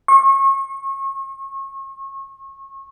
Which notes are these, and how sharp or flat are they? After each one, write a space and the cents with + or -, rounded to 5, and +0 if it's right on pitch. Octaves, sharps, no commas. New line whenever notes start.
C#6 -35